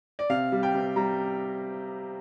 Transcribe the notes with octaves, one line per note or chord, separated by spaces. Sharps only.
D5
C3 F5
G3
G5
C3
G3 A#5